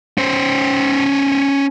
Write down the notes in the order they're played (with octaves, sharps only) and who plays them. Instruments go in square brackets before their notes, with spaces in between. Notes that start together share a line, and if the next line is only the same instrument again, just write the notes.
[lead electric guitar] C#4 C5